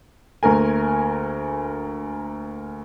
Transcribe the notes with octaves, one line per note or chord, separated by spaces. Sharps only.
D2 A#3 A#4 G#5